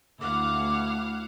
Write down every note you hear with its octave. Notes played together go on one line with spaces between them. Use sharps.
D2 E4 F5 F#5 D6